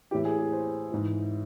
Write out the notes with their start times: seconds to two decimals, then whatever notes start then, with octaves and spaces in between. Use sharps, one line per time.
0.11 A2 E3 G4
0.25 G#4
0.39 G#4
0.52 C5
0.92 G#2 E3